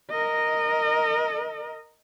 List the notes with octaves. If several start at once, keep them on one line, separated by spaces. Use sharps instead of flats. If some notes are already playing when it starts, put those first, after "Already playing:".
A#4 D#5